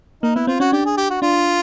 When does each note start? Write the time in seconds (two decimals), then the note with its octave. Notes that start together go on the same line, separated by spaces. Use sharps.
0.23 A#3 D#4
0.35 B3 E4
0.47 C4 F4
0.60 C#4 F#4
0.72 D4 G4
0.86 G#4
0.97 G4
1.10 F#4
1.22 D4 F4